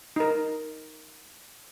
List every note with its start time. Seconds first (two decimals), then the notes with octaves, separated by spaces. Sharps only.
0.16 D#4 A#4